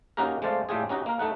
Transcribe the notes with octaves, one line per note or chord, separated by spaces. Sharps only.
A#3 C#4 D#4 F#4 G4 A#4
G#3 A3 C4 C5 D5 F5
A2 G3 A3 F4 G4 G#4
C#4 D#4 F#4 G4 D#5
A#3 A#4
A3 D#4 F#5